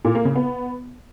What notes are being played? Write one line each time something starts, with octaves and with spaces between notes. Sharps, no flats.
A#2
A#3
C#3
B3